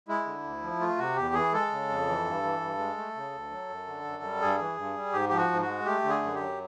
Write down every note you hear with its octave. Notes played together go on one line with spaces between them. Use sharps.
G#3 E4
D3
D2
F3
A3 F4
C3 F#4
E2 G4
E3 G#4
G#3 A4
C#3
F2
E3
G2
E3
G2
G#3
A3
C#3
D2
F#3
F#2
D3
F#2
G3
G2 G#4
E3
G2
G3
G#2 G4
F3 G4
F#4
G#2
F#4
G#3
A3 G4
D3
G#4
F#2
G4
F#3